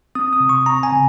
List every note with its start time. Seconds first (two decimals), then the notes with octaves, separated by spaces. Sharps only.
0.15 C4 D#6
0.33 D#6
0.40 C3
0.49 C#6
0.66 C4 A#5
0.83 G#5
0.92 C#3